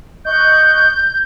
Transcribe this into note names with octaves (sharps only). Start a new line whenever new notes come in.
D#5 C#6 F#6 G6